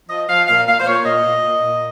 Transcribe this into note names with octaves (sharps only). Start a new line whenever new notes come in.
F3 D#5
F3 F5
A#2 F5
A#2 F5
C5
A#2 C#5
A#2 D#5
A#2
A#2
A#2